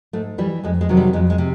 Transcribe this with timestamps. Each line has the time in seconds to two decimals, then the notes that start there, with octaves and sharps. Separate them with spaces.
0.13 G#2 A3
0.38 E3 G3
0.63 F2 G#3
0.81 G#3
0.89 C3 D#3 F#3
0.97 G3
1.13 F2 G#3
1.30 G#3
1.38 C3